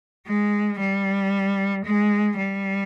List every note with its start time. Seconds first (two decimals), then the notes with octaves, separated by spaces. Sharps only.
0.27 G#3
0.80 G3
1.85 G#3
2.37 G3